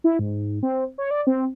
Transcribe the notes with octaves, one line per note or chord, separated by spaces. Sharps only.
E4
G#2
C4
C#5
D5
C4